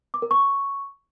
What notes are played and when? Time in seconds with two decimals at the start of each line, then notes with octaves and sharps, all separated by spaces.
0.14 D6
0.22 A#4
0.31 C#6